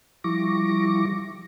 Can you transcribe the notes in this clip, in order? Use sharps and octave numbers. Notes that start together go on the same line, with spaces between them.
F3 G3 E4 C#6 D6 A#6